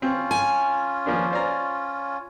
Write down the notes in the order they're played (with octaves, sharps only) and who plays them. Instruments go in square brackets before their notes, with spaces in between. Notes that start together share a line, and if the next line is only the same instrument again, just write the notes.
[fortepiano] C4 [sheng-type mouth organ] C#4 F4
[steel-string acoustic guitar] G#5
[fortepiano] F3 A#3 D4
C5 D5 A#5